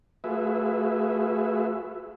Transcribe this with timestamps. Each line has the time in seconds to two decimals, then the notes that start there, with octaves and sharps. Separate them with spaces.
0.24 A3 F4 F#4 G#4 B4 E5